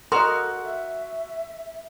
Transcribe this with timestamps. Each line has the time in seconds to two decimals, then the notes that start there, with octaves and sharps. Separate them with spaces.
0.12 F#4 A4 A#4 D#5 C6 F6
0.65 E5